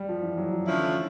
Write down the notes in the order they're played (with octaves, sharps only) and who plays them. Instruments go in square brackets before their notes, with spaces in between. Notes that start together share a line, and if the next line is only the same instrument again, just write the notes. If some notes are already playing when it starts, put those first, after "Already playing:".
Already playing: [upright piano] G3
F3
E3
F#3
F3
[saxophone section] D3 F3 A3 C#4 E4 [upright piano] E3